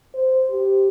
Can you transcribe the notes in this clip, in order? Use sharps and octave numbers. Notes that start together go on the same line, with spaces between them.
C5
G4